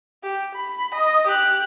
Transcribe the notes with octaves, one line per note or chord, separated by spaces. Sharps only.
G4
B5
D#5
G4 F#6